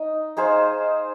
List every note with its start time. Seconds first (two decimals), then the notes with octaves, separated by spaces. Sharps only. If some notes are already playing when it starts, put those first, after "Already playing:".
Already playing: D#4 D#5
0.37 D#4 G#4 C5 F5